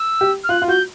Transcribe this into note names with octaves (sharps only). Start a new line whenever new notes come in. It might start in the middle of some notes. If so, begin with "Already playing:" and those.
Already playing: E6
G4
F6
F4 F#6
F4
F#4 G6